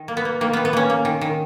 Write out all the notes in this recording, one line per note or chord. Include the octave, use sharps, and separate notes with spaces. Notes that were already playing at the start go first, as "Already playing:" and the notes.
Already playing: D#3
A#3
B3
A#3
D#3 A#3
D#3 B3
B3
A#3 C#4
A#3
D#3
D#3